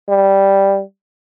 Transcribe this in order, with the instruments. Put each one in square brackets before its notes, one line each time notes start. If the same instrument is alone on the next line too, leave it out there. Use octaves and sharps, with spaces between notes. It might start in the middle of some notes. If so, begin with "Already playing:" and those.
[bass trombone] G3